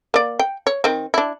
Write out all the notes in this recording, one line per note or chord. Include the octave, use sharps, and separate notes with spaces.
A#3 D5
G5
C#5
D#3 C4
D4 E4